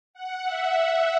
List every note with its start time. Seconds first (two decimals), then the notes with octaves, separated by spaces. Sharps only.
0.14 F#5
0.45 E5